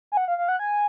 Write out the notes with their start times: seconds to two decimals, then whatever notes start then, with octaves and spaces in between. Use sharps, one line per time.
0.12 G#5
0.17 F#5
0.28 F5
0.38 F5
0.49 F#5
0.59 G#5